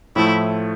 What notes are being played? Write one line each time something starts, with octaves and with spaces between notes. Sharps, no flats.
A2 F3 A3 E4